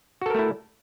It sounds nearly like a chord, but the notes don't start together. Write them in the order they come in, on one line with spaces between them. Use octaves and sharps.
F#4 A4 A#4 A3 E4